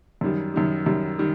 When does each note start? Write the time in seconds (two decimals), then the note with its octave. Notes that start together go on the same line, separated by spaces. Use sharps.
0.21 F#2 D#3 G3
0.54 F#2 D#3 G3
0.86 F#2 D#3 G3
1.19 D#3 G3